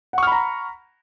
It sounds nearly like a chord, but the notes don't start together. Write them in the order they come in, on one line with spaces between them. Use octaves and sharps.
F#5 C#6 F6 B5 A#5